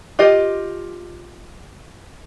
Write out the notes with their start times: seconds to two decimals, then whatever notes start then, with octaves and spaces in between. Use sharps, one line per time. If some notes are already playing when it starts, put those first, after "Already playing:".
0.19 F4 G4 D#5